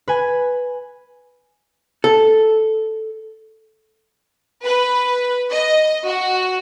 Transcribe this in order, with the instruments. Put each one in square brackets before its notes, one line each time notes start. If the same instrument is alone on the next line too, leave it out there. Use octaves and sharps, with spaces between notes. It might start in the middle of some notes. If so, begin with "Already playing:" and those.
[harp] B4 G#5
[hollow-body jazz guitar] A4
[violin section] B4
D#5
F#4